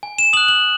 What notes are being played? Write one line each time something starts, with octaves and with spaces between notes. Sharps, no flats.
G#5
E7
D#6 F#6 F#7
F#7